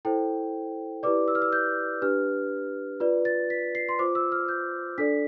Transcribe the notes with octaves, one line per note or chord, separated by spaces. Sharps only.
E4 A4 C5 G5
E4 G4 B4 D5 D6
E6
F6
E6
G6
D4 G4 B4 F6
F4 B4 D5
A6
B6
C7
C6
F4 C5 D6
E6
F6
G6
D4 A4 D5 B6